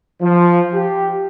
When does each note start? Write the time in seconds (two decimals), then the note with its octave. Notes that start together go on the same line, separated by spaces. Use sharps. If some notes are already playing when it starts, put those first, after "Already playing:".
0.22 F3
0.73 G4